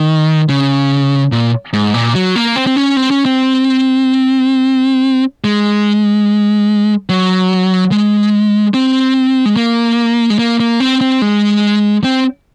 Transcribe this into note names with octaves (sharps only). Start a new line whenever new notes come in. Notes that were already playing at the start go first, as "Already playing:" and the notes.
Already playing: D#3
C#3
A#2
G#2
A#2
F#3
A#3
C4
C4
C#4
C4
C#4
C4
G#3
F#3
G#3
C4
G#3
A#3
G#3
A#3
A#3
C4
C4
G#3
C4